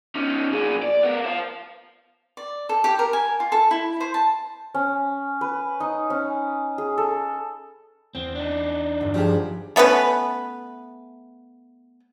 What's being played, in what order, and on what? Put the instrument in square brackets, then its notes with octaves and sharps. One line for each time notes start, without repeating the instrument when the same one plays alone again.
[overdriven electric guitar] C#4 D#4
A#2 G#4
D5
B3 A#4
C5 F5
[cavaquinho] D5
A4
G4
A#4
G#5
F4
A4
E4
C5
A5
[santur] C#4
B4
D#4
C#4
G#4
A4
[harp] E2 [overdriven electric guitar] C4
[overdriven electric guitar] D4 D#4
[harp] G1 F#2
[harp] G2 A3 [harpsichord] F3 [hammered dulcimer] G4 G#4
[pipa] A3 B3 C#4 B4